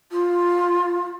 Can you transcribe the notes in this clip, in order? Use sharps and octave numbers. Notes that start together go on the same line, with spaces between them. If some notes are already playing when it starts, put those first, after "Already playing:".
F4